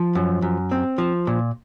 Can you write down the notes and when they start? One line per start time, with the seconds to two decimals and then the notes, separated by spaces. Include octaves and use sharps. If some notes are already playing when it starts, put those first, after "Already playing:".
Already playing: F3
0.15 F#2
0.42 F#2
0.72 C4
0.98 F3
1.27 A#2